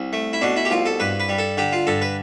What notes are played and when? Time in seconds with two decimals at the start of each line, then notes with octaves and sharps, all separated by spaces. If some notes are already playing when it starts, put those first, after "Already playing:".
Already playing: C2
0.13 A3
0.33 E4
0.41 B2 D4
0.57 E4
0.65 G4
0.71 C2 F4
0.86 A4
1.00 G2 B4
1.20 B4
1.29 G3
1.38 A4
1.58 D3 G4
1.73 F4
1.87 G2 A4
2.02 B4